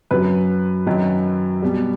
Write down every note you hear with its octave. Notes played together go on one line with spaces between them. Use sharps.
F#2 F#3 B4
F#2 D#3 F#3
B2 G3